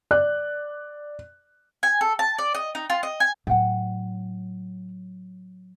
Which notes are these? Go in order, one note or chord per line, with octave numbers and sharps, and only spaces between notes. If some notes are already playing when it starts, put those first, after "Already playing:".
D5 F#6
G#5
A4
A5
D5
D#5
D#4
F4
D#5
G#5
A2 F#3 F#5 G5